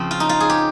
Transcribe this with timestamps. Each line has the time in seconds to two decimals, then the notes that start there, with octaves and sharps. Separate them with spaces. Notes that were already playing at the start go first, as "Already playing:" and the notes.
Already playing: C#3 F3 C4
0.11 F4
0.20 D#4
0.29 F4
0.40 G#4
0.50 G4